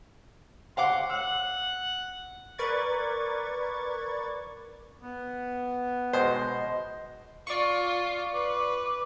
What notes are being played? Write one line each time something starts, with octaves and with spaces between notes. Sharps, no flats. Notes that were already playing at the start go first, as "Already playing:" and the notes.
F5 F#5 C6 D6
F#5 E6
A#4 B4 D5 C#6 G#6 A6
B3
B2 G#3 C5 D#5
F4 D5 C#6
B4 D6